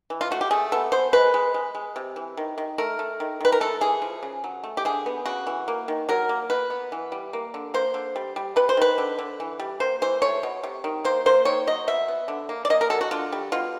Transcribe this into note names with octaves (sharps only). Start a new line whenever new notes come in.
E3
F4
A3 F#4
G4
A3 G#4
B3 A4
B3 C5
G#3 B4
G#3
G#3
G#3
C3
E3
D#3
D#3
A3 A#4
A3
D#3
D#3 B4
A#4
A3 A4
E3 G#4
F3
C#3
F#3
A3
G4
D3 G#4
B3
C#3 F#4
E3
A#3
D#3
F#3 A#4
A#3
B2 B4
B3
E3
G3
A#3
D3
A#3 C5
D3
G3
G3
C3 B4
C5
D#3 B4
D3
D3
E3
G3
A#3 C5
E3 C5
A3 C#5
B2
C3
D#3
A#3 C5
A#3 C5
D#3 C#5
F#3 D#5
B2 E5
B3
D3
A#3
D5
A#3 D#5
A#4
F#3 A4
F#4
D3 F4
G3
B2 F4